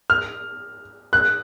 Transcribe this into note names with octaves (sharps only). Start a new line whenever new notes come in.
F6
F#6